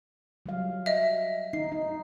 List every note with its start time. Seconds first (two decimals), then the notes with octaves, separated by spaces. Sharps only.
0.46 F#3 G3 F5
0.86 D#5 E5
1.53 D#4 C7
1.72 D#4